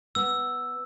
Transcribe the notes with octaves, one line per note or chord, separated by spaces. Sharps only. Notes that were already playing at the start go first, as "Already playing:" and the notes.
B3 E6